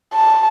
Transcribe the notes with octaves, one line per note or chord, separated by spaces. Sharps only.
A5